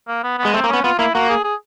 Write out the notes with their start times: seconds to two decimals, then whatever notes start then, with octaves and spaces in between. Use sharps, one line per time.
0.08 A#3
0.23 B3
0.39 B3
0.45 G#3
0.54 A3 C4
0.64 A#3
0.69 B3 C#4
0.84 B3 F4
0.99 A#3 E4
1.14 A#3 F#4
1.29 G#4
1.44 G#4